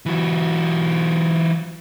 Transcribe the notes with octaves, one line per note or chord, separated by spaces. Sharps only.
E3 F#3